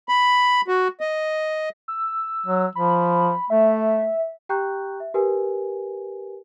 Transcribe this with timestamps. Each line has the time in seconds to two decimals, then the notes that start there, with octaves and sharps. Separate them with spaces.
0.09 B5
0.68 F#4
1.01 D#5
1.88 E6
2.46 F#3
2.76 F3 B5
3.50 A3 E5
4.49 G4 G5 A#5 C#6 F#6 G6
5.00 E5
5.14 G4 A#4 B4 G#5